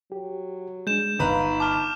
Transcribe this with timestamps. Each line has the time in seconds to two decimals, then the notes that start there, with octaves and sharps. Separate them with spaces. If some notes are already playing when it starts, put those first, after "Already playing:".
0.12 F#3 G4
0.87 G#3 D4 G6 E7
1.19 G1 D#4 B4 D#5 F5 A#5
1.60 A5 D6 F6